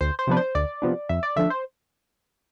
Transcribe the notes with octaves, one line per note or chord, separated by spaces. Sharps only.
D2 C5
C5
C3 F3 B3 D4 B4
C5
D2 D5
C3 F3 B3 D4
F2 E5
D5
D3 F3 A3 D4 E5
C5